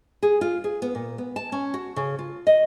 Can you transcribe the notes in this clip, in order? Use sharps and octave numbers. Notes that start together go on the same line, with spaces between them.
G#4
F4
G#4
B3
A#2
B3
A5
C#4
F#4
C#3
F4
D#5